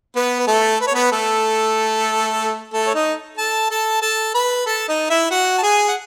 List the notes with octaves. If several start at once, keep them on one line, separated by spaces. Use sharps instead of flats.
B3 B4
B4
A3 A4
B4
C#5
B3 B4
A3 A4
A3 A4
C#5
D#4 D#5
A4 A5
A4 A5
A4 A5
B4 B5
A4 A5
D#4 D#5
E4 E5
F#4 F#5
A5
G#4 G#5
F#5